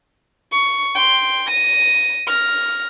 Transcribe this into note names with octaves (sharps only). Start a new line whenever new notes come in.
C#6
G5 C6
A#6 D#7
F6 A#6